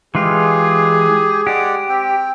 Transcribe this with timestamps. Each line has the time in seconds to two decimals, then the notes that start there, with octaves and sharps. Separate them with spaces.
0.15 E3 G#3 F4 G4 G#4
1.47 G#3 G4 D5 F#5
1.89 C4 G5